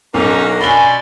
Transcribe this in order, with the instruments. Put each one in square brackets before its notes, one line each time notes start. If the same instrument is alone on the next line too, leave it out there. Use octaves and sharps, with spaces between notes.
[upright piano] B1 [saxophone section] D3 F#3 A#3 [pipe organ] C#4 D#4
[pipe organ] B2 D5 C6 [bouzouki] C#4 F5 G#5 [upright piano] B5 G7